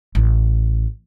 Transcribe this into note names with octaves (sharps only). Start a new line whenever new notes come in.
A1